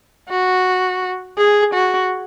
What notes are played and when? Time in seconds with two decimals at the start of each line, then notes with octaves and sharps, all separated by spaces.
0.29 F#4
1.38 G#4
1.74 F#4